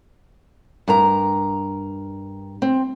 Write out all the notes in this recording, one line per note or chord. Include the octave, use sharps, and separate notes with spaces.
G2 A#4 A#5
C4